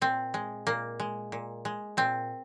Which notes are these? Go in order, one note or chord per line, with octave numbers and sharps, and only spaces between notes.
A#2 C4
G#3
A#2 A#3
G#3
A#2
G#3
A#2 C4